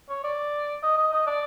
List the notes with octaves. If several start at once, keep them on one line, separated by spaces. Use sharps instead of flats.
C#5
D5
D#5
D#5
D#5
D5